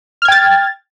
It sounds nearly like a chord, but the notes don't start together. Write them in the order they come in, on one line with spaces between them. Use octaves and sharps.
F6 G#6 G5 A6